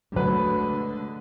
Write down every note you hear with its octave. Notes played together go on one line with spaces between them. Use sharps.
D2 D3 F#3 G#3 B4